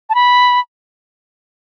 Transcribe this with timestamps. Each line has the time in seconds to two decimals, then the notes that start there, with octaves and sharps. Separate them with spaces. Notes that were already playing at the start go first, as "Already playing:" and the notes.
0.10 A5
0.15 B5